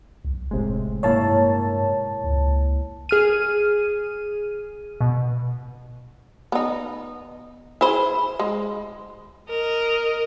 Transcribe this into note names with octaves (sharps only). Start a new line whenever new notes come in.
B1
F1 A2 C3 G#3
G2 A#3 E4 C#5 A5
C#2
G#4 F6 D#7
B2
B3 D#4
E4 G#4 C5
G#3
A#4 D#5